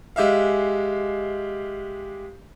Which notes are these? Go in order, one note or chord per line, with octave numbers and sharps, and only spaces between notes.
G#3 G4 E5 F5